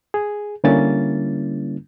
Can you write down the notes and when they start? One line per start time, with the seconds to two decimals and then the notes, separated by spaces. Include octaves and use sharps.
0.14 G#4
0.64 D3 G3 A#3 C#4 E4 A6